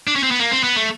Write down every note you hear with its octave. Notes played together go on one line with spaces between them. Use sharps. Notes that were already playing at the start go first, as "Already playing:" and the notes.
D4
C#4
C4
B3
A#3
C4
B3
A3